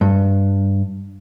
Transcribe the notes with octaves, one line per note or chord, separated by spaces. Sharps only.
G2